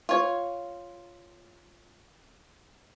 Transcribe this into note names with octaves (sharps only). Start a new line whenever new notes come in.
F4 C#5